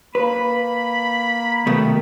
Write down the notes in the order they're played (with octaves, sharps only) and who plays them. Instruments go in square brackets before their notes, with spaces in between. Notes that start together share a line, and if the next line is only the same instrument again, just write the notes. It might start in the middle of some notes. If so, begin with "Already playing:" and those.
[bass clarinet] A#3 [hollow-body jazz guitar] B4 [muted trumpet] B5
[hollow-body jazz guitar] C2 B2 A3 [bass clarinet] D#3